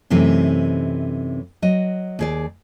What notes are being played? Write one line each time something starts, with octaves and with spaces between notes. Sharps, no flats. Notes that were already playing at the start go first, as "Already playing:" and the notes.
F#2 C3 E3 A3 C4 D#4
F#3 D#5
D#2 G#4 D5